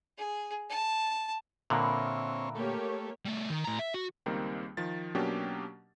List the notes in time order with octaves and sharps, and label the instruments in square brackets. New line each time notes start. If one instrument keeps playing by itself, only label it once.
[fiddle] G#4
A5
[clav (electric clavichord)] A#2 D3 [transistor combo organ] C4 C#5 [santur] A#4 B4 E5
[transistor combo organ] A3 [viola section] A#3 G4 C#5
[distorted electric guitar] G3 A3
D#3
A2 A#5
E5
F#4
[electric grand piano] C#2 D#3 G3 A#3 C4
D#3 F3 A6
B2 F#3 A#3 C#4 D4 G4